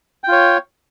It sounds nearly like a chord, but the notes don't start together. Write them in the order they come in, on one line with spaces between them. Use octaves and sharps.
G5 F4 C#5